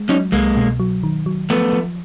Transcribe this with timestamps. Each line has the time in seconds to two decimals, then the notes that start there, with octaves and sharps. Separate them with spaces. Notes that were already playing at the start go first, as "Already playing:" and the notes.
Already playing: G#3
0.09 F#3 C#4 D#4
0.32 C2 G#3 A#3
0.57 B2
0.80 F#3
1.03 D#3
1.26 F#3
1.50 F3 A3 B3
1.73 F3